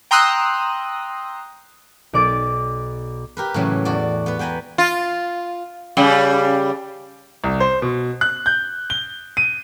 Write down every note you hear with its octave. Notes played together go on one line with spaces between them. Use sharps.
G5 A#5 C6 D#6 E6 F#6
B1 D5 D6 A6
G4 A#4 B4
A2 C#3 E3 F#3
E2 F#4 D5
B3 B4
B3 G5 G#5 A#5 B5
F4
C#3 G3
C2
C5
B2
F#6
G6
G7
D#7